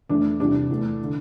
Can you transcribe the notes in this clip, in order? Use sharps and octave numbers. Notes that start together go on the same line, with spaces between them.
E2 E3 A3 D4
E2 C3 G3 D4
E2 E3 A3
D3